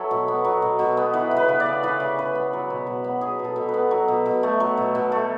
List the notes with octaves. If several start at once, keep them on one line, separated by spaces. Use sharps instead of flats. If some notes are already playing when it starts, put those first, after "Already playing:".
Already playing: F#3 A4 B4 C#5 E5
B2
B3
F#3
B2
B2
B3
E3 B4
C#3
B4
C#3
D5
B3
E3 B4
C#3
C#3 B4
B3
F#3
B2
B2
B3
F#3 G#4
B2
A4
B2
B4
B3
F#3
B2
B2
A3
F#3
B2
B2
A3